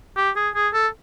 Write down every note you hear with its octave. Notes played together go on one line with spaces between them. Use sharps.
G4
G#4
G#4
A4